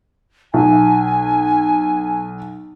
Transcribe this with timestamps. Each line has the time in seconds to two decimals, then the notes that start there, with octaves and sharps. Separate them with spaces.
0.54 B1 G#5